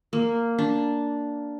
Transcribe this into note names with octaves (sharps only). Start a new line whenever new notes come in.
A#3
D4